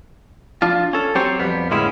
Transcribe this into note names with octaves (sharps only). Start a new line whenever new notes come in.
F3 D4 F4
C#4 A4
F#3 C4 G4 C5 C#5
F2 G3 B3
A2 D3 G#3 A#3 C#4 E4